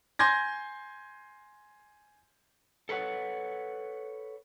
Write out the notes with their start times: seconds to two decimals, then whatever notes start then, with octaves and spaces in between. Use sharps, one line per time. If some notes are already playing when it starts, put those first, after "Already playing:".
0.19 G#5 C6 G6 G#6 A#6
2.89 A4 B4 C#5 F#5